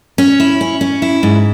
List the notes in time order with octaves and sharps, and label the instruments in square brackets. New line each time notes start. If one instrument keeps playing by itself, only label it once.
[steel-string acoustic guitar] C#4
E4
C#4
C#4
E4
G#2